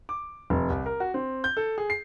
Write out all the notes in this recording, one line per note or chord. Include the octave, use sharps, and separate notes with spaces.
D6
F1
C2
A#4
F#4
C4
G6
A4
G#4
C7